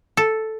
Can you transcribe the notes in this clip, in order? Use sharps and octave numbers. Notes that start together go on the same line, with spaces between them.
A4